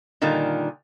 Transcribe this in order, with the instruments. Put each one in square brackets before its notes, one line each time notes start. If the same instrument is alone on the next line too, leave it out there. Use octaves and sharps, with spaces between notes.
[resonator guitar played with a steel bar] A#2 D3 D#3 G3 F4